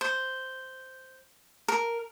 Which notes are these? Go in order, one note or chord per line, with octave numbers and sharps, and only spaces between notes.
C5
A#4